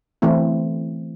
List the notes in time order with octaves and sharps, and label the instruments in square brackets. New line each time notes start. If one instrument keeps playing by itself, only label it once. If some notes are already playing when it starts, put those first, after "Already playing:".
[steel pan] E3 A3 C4 E4